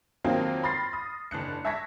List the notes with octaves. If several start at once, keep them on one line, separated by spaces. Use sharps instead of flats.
F2 D#3 F#3 A#3 C4 F4
B5 C6 F6 A6 A#6 C7
D#6
F#1 D4 F#6 C#7
E5 A5 C#6 G#6 A#6 B6